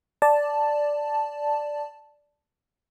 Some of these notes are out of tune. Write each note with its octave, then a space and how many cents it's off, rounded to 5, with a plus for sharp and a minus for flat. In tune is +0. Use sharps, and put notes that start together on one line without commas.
D5 +0 A5 +0